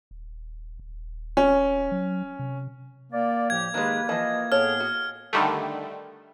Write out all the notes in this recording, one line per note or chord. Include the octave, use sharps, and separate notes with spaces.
D#1
D#1
C#4
F#3
C3
A#3 D5
A2 F3 G4 G#6
D#3 G#3 A#3 G4 B4
E3 F3 D#5
A2 B3 G#4 A4 C#5 F6
F#4
D3 D#3 G3 A3